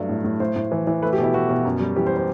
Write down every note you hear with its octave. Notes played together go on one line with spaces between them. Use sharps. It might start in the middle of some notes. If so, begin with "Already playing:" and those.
Already playing: G2 F#3 A3 D5
A2
A2
A2 C5
A2
E3
E3
A3 B4
G4
B2
E4
B2 F#4
B2
F#2
G3
E3 G4
C5
C5